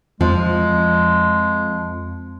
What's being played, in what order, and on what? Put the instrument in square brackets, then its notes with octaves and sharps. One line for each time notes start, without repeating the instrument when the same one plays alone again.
[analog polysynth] F2 [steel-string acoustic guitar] F3 [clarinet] G#3